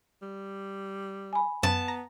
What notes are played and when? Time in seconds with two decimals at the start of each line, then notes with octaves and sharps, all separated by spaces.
0.22 G3
1.33 G#5 B5
1.63 F#2 B3 A5
1.88 A#5